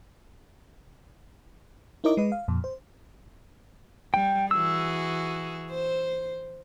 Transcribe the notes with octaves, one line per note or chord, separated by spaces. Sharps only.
D#4 E4 A#4 C#5 D#5 D6
G#3 B4 D#5
F5
F2 A#2
C5
G3 G5
E3 F#4 G#4 E6
C5